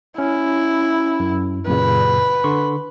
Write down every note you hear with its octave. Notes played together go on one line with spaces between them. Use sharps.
C#4 E4
F#2
F#2 A#2 C#3 B4
D3 C6 C#6